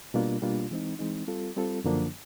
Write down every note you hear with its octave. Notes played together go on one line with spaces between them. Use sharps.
B2 G3 A#3 D4 F4
B2 G3 A#3 D4 F4
E3 G#3 C4 D#4
E3 G#3 C4 D#4
G3 C4 F4 A4
G3 C4 F4 A4
F#2 D3 F3 A#3 D4